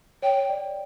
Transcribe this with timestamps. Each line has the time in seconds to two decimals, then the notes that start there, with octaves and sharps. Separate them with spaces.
0.22 C#5 G5
0.49 D5